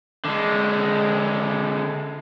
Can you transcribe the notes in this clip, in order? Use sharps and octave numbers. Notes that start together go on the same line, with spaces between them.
D3 G#3